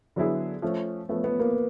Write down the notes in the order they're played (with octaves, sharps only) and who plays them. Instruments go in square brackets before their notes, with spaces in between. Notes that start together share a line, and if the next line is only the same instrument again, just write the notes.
[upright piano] D3 F#3 B3 E4 G#4
F3 A3 C#4
[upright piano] F3 A3 C#4 [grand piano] B3
[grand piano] B3
A#3